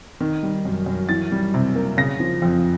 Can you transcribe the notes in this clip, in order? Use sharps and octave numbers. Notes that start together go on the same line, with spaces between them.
D#3
G3
F#2
F#2
E3 A6
G3
C3
A#3
C#3 A#6
F3
F2